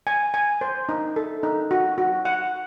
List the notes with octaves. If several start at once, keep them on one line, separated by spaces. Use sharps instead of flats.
G#5
G#5
C5
D#4
A4
D#4
F#4
F#4
F#5